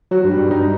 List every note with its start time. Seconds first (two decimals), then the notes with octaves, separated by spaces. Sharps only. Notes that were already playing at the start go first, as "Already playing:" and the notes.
0.11 F#3 F#4
0.24 G2
0.31 G3
0.38 G2
0.51 G2 D#4